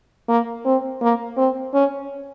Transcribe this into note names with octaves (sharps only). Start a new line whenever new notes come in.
A#3
C4
A#3
C4
C#4